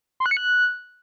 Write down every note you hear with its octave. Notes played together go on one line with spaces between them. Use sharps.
C6
F#6
C#7
F#6